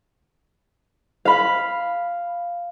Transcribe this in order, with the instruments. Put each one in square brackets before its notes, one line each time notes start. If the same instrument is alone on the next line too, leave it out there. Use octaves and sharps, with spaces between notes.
[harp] F5 B5